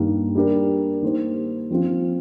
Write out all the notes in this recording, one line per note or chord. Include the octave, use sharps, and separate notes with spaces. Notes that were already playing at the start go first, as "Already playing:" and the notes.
Already playing: G2 D#3 A#3 D#4
G3 D4 G4 A#4
D#3 A#3 D#4 G4 C5
F3 C4 F4